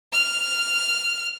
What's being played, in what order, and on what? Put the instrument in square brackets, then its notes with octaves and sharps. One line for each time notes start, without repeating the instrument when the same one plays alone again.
[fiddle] F6